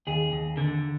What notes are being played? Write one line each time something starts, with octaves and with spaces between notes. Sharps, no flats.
D#2 G#4
D#2
D3